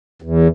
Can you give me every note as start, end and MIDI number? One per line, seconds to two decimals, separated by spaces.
0.22 0.48 40